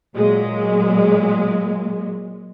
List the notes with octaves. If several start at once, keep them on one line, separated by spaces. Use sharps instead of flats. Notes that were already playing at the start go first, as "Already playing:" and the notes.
A#2 F#3 G#3